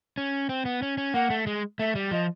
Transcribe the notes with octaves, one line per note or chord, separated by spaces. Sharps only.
C#4
C4
B3
C#4
C#4
A#3 F#5
A3
G#3
A3 E5
G3
F3 D#5